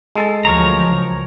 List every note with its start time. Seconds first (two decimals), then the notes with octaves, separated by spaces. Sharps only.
0.15 G#3 A4 A5
0.45 D2 F3 F#3 A#4 C#5 A#5
0.84 C#2